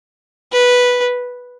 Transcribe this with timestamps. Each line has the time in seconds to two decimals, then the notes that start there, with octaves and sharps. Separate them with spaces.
0.52 B4